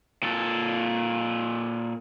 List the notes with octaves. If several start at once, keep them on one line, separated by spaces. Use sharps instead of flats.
A#2 A4